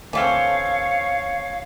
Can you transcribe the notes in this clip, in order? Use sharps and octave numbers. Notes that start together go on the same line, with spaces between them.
D2 E3 A3 C4 C#5 F5 A5 F6